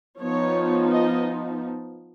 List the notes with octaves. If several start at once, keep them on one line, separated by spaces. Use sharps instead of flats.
F3 B3 D#4 C#5
D#5